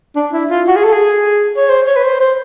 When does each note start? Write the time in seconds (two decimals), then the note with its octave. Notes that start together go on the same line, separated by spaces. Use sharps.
0.16 D4
0.33 E4
0.50 F4
0.68 F#4
0.76 G#4
0.84 A4
0.93 G#4
1.56 C#5
1.69 C5
1.87 C#5
1.96 B4
2.04 C5
2.20 C5